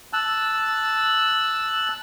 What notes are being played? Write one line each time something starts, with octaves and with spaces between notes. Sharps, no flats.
A5 E6 F#6